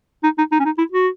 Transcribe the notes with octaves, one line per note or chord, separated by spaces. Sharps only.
D#4
D#4
D#4
C#4
D#4
E4
F#4